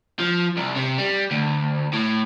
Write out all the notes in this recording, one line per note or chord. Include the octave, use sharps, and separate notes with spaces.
F3
C2
C3
G3
D2
A2